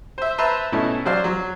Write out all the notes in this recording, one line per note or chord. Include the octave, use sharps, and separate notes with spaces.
C5 E5
B4 C5 E5 A5 A#5 C6
B2 A3 C#4 D#4 E4
F#3 C5 D5 F5
F#3